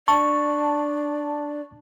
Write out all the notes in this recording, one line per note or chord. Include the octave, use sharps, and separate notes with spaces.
D4 D5 A5 C#6